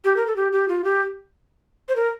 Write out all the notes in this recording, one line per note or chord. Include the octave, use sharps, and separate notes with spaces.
G4
A#4
A4
G4
G4
F4
G4
C5
A#4